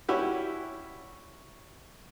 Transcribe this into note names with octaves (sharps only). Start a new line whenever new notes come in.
G3 C#4 E4 F#4 G4